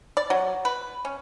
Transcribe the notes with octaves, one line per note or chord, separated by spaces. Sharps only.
D5
F#3
B4
C#4